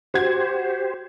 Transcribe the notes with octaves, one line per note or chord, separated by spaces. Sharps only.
F#4 G4 C5 G#6